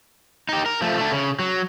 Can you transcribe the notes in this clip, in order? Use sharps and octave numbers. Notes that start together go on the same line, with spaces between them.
D#4 G4
A#4
F3 A3
A3 D4
C#3
F#3